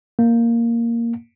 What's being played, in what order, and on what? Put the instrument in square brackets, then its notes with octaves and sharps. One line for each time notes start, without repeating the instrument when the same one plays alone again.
[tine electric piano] A#3